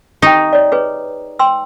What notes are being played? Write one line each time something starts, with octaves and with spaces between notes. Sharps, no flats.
D#4 G4 G5
C#5 D5
G#4 B4 C#5
G5 C6 E6